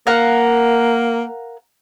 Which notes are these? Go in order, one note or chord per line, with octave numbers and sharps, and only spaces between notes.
A#3 A#4 F5 F#5